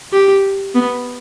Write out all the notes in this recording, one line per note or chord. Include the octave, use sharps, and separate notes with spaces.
G4
B3